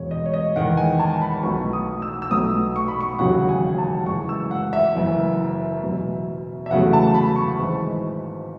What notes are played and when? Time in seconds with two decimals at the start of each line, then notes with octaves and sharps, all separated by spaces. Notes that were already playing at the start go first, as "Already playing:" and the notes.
Already playing: E1 E2 B2 G#3 C#5
0.11 D#5
0.26 C#5
0.34 D#5
0.56 E2 D#3 G#3 F#5
0.77 G#5
0.99 A5
1.21 B5
1.43 B1 B2 A3 C#6
1.73 D#6
2.02 E6
2.22 E6
2.31 B1 B2 A3 D#6
2.76 C#6
2.88 B5
3.01 C#6
3.19 E1 D#2 C#3 F#3 F#5
3.49 G#5
3.78 A5
4.06 F#1 F#2 E3 G#3 C#6
4.29 E6
4.51 F#5
4.73 E5
4.95 F#1 F#2 E3
5.83 F#1 E2 B2 F#3
6.66 E5
6.70 E2 C#3 F#3 A3 F#5
6.93 A5
7.15 B5
7.36 C#6
7.58 G#1 G#2 E3 G#3